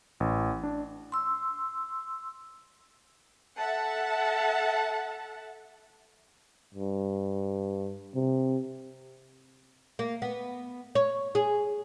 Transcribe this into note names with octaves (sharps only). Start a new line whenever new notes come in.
A1
D4
C6 E6
A4 E5 F#5 A5
G2
C3
A#3
B3
C#5
G#4